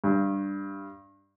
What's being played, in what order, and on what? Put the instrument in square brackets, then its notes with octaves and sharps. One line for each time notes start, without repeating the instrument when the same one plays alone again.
[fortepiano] G2